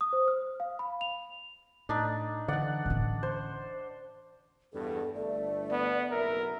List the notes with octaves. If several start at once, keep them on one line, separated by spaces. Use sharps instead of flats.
D#6
C5
F6
F5
B5
F7
A2 D4 D#4
D3 E3 D5 F#5
A2 C#4
C5
E2 G2 B2 A4
G1 A3 D5
B3
F#1 B1 A#4 E5